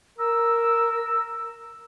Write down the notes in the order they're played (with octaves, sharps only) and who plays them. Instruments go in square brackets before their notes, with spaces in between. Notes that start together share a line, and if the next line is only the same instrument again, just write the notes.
[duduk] A#4 [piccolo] E6